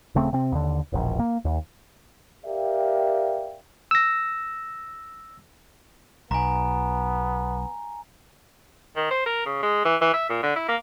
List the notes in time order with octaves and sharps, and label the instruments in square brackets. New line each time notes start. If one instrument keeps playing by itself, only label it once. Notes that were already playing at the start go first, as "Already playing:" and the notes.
[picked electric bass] D#1 C#3 A3 C4
C3 C4
D#2 D3
E1 A#1
A#3
D#2
[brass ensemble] G4 A#4 D5 E5 F5 G5
[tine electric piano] E6 A#6
[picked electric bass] B1 [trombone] B3 [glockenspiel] G#5 A#5
[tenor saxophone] D#3
C5
A#4
C#3
G#3
E3
E3
E5
A#2
D3
E4
A#3